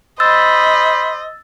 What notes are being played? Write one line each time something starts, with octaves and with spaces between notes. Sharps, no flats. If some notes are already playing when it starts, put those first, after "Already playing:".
C5 D#5 B5 E6 A6